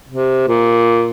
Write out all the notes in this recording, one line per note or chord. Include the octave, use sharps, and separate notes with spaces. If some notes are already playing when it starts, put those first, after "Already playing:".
C3
A#2